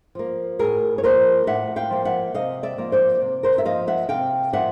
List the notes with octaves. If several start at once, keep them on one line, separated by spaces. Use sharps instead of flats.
F3 A#3
A2 G#4 A#4
C#5
F3 A#3 A#4 C5
A2 E5 F#5
F5 G5
F3 A#3
E5 F#5
C3 D#5 F5
D5 E5
F3 A#3
C5 D5
C3
A#4 C5
E5
F3 A#3 D#5 F5
E5 F#5
C3 F5 G5
F3 A#3 E5 F#5